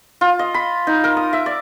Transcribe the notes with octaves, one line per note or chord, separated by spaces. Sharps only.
F4
D#5
B5
D#4
A#4
D#6
E5
D5